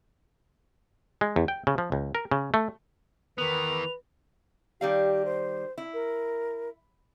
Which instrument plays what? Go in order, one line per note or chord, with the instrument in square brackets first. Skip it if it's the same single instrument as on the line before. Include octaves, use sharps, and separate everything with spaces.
[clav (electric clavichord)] G#3
E2
G5
C#3
F3
C#2
A#4
C#3
A3
[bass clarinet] D#3 [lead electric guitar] E3 B3 [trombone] B4 [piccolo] F7
[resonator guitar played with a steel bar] D#3 G3 F5 [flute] G4
[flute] C5
[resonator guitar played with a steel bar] E4
[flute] A#4